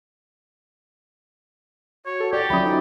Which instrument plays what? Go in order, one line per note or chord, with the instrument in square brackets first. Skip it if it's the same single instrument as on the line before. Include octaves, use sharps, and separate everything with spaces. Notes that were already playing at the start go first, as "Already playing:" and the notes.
[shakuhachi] F#4 [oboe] C#5
[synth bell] A4
[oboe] G4 [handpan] D5
[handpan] F3 F#3 C#4 [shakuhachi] E5 [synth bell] B5 D#6
[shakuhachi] D#4